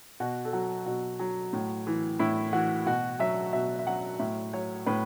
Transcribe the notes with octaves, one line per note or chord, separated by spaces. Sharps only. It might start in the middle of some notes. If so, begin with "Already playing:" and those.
B2 F#4
A4
F#3 F#4
B2 F#4
F#3
A2
E3
A2 E4
E3 F#4
B2 F#4
F#3 E5
B2 E5
E5
F#3 F#5
A2 E5
F#3 C#5
A2 B4